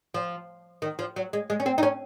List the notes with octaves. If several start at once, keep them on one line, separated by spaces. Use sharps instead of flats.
F3
D#3
F3
F#3
G#3
G#3
C#4
C4
D#4
C#4